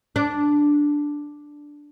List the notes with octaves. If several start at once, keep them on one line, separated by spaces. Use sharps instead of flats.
D4